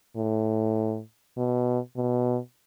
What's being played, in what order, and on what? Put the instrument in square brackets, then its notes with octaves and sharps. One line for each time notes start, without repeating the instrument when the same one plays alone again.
[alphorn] A2
B2
B2